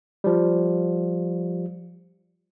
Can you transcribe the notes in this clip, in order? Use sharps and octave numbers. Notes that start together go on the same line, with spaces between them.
F3 G3